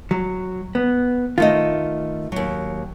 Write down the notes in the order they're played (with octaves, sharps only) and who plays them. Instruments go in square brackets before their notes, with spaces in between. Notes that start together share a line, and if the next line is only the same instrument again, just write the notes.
[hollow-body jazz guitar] F#3
B3
[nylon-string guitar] D#3 A3 D#5 [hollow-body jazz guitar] F4
[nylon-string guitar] D#2 F#3